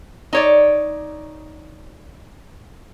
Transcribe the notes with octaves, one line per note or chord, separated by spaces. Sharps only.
D#4 C#5 D5